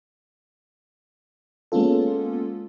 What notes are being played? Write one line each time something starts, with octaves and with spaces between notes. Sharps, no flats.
G#3 A#3 B3 C#4 F4 A4